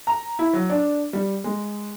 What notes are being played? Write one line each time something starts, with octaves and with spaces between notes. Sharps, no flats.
A#5
E4
F#3
D4
G3
G#3